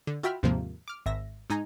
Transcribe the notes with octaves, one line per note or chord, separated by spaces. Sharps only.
D3
F4 F#4 E5 G5 B5 F6
D#2 G#2 C3 D#3 F3 A#3
D6 F6
G#1 E5 A#6
G#2 D#4 G#5 A#5